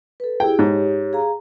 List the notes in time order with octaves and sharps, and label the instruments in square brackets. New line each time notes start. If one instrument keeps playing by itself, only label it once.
[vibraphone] A4 B4
[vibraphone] E4 G4 G#4 [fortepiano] G5
[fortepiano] G#2 [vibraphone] G4 C#5
[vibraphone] G#4 F5 A#5